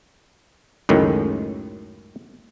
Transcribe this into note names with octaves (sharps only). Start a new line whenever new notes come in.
C#2 F#2 A2 D#3